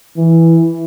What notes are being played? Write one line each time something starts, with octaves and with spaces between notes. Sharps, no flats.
E3